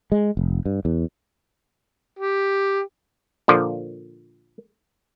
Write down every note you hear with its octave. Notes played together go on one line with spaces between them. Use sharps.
G#3
F1
G2
E2
G4
A#2 D3 F3